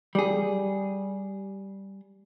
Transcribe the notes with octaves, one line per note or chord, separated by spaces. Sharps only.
G3 G#4